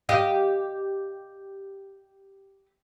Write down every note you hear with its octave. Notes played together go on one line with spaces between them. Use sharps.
G4 D#5 F5